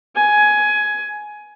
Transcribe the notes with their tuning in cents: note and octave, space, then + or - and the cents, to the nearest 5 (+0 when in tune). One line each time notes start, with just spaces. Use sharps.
G#5 +15